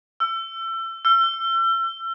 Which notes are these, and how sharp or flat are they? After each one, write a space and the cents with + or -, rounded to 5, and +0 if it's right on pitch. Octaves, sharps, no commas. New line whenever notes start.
E6 +30
E6 +40